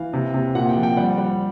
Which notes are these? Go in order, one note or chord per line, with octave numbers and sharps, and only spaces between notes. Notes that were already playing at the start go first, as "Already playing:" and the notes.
Already playing: E3 F5
C3
C3
A#2 F#5
G5
F3
G5
G3 F#5
G3